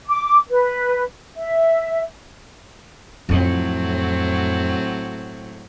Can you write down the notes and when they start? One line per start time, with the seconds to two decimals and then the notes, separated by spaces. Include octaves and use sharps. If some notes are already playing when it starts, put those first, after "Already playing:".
0.07 D6
0.49 B4
1.36 E5
3.29 F2 A2 F#3 C4 E4